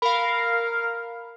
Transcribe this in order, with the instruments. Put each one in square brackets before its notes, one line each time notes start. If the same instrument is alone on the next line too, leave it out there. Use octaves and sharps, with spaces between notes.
[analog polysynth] A#4 F5 [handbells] B5